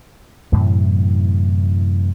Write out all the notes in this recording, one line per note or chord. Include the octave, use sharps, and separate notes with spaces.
F#2 A2 C3 E3